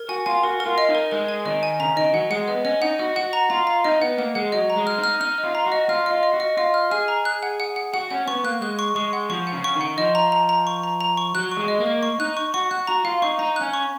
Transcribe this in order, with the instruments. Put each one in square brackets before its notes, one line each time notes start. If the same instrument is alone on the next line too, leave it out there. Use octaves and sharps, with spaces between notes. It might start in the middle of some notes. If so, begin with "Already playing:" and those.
Already playing: [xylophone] A#4
[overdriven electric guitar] F#4 [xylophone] G#5
[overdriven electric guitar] F4 [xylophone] G#5
[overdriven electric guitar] F#4 [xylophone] A#4
[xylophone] A#4
[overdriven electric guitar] F4
[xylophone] D#5
[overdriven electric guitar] D#4
[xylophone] A#4
[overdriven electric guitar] G#3 [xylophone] A#4
[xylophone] G#5
[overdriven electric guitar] D#3 [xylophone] D#5
[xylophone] G#5
[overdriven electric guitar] C#3 [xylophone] A#5
[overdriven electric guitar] D#3 [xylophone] D#5
[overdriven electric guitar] F#3 [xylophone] F#5
[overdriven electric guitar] G#3 [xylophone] F#5
[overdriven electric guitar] B3 [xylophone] D#5
[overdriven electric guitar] C#4 [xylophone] D#5
[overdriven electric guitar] D#4 [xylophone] F#5
[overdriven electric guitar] F#4 [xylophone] D#5
[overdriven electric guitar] F#4 [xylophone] F#5
[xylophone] A#5
[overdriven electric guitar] F4 [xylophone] A#5
[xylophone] A#5
[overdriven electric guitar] D#4 [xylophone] D#5
[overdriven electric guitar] B3 [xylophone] F#5
[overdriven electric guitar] A#3 [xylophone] F#5
[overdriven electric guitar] G#3 [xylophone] F#5
[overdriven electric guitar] F#3 [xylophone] D#5
[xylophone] A#5
[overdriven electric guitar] G#3
[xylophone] F6
[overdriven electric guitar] D#4
[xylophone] F6
[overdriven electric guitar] D#4 [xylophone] F6
[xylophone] D#5
[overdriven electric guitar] F4
[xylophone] A#5
[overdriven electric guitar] F#4
[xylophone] D#5
[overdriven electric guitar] F4 [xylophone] F6
[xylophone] D#5
[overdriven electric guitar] F4
[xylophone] D#5
[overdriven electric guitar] F#4
[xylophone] D#5
[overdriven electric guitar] F4 [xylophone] D#5
[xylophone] F6
[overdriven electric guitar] G#4 [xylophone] F6
[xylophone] A#5
F#6
F#5
F#5
F#5
[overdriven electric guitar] F#4 [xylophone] F#5
[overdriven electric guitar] C#4 [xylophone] F#5
[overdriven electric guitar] B3 [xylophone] C#6
[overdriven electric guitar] A#3 [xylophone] F#6
[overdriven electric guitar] G#3 [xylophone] F#6
[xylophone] C#6
[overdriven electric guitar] G#3 [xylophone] C#6
[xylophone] F#5
[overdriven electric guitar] F3 [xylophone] C#6
[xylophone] F#5
[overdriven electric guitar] C#3
[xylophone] C#6
[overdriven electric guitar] D#3
[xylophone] F#5
[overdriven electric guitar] F3 [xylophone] D#5
[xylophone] A#5
A#5
A#5
C#6
A#5
A#5
C#6
[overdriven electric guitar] F#3 [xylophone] F#6
[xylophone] C#6
[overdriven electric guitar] G#3
[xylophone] D#5
[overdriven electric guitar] A#3
[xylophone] D#5
C#6
[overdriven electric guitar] D#4 [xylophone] F#6
[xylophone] C#6
[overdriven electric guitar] F#4 [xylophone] C#6
[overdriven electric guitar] F#4 [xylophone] F#6
[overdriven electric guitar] F#4 [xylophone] A#5
[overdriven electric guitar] F4 [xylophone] F5
[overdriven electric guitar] D#4 [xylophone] C#6
[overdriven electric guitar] D#4 [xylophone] A#5
[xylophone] F#6
[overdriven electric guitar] C#4
[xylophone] C#6